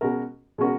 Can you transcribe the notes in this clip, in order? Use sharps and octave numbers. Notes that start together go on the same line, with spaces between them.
B2 G#3 C#4 F#4 A#4
B2 G#3 C#4 F#4 A#4